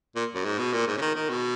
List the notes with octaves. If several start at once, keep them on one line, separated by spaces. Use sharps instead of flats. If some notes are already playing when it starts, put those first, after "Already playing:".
A#2
F#2
G#2
B2
A#2
G#2
C#3
D#3
D#3
B2